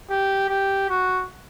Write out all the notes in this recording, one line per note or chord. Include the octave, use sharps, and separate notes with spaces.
G4
G4
F#4